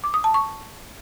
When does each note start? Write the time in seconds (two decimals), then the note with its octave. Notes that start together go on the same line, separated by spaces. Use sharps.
0.04 D6
0.14 D#6
0.24 A5
0.34 C#6